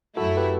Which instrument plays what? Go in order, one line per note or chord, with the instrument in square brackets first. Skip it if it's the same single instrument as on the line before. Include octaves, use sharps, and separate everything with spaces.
[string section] F#2 F#3 A3 E4 [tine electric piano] F#4 A4
[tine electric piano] G4 B4